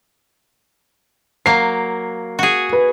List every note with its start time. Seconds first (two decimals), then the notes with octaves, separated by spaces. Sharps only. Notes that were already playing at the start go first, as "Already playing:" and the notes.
1.46 F#3 A#3 C7
2.39 F#4 G#4
2.73 B4